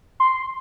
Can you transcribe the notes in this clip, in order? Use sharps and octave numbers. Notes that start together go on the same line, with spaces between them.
C6